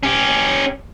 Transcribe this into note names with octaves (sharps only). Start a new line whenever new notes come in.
C#4 G4